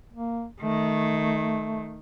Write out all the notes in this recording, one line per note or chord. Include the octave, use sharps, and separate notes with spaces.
A#3
D#3 A3